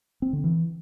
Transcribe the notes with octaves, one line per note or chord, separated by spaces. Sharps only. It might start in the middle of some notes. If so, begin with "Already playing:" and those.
C4
D3
E3